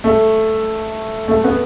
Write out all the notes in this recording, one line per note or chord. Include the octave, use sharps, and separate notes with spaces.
A3
A3
B3